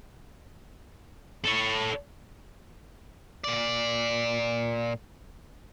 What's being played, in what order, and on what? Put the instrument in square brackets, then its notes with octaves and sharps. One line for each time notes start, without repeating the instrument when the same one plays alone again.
[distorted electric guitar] A4 C#5
[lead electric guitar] A#2 D5